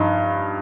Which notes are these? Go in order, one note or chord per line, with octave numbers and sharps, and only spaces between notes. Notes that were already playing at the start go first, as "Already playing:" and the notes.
Already playing: G2 F3 D#4